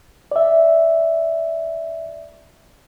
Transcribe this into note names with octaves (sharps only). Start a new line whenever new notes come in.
D5 E5